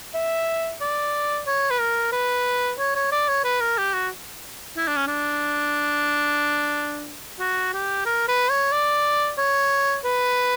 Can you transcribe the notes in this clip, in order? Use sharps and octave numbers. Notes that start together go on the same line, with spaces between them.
E5
D5
C#5
B4
A#4
B4
C#5
C#5
D5
C#5
B4
A#4
G4
F#4
E4
D4
C#4
D4
F#4
G4
A#4
B4
C#5
D5
C#5
B4